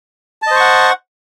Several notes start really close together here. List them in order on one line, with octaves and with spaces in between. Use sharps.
A5 D#5 C5 C#6 F#5